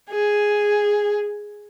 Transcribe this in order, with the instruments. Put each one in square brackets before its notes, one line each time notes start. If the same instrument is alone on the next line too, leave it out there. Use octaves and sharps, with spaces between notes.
[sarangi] G#4